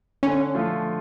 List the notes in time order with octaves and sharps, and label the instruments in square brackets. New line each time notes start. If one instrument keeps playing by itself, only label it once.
[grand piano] D3 [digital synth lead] C#4
[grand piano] F3 A3 F4